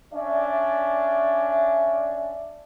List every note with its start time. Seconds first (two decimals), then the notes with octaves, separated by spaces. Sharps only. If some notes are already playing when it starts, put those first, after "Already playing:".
0.14 C#4 D4 D5 E5